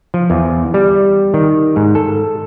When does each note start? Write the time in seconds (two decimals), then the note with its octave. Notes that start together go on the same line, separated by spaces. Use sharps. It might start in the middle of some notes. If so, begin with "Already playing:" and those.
0.14 F3
0.30 E2
0.74 G3
1.34 D#3
1.76 G#2
1.95 A4